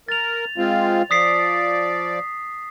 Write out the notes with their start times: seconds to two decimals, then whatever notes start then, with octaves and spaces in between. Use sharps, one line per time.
0.09 A#4 A6 F7
0.58 G#3 C4 F4
1.11 F3 D5 D#6 B6 C7